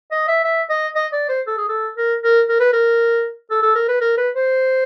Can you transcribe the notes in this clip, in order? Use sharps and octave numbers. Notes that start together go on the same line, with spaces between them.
D#5
E5
E5
D#5
D#5
D5
C5
A4
G#4
A4
A#4
A#4
A#4
B4
A#4
A4
A4
A#4
B4
A#4
B4
C5